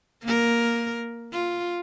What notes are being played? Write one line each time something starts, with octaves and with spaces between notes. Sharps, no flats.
A#3 A#4
F4